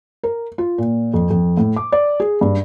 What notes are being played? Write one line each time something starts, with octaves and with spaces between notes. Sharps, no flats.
A#4
F4
A#2
F2
F2
A2
D6
D5
G#4
G2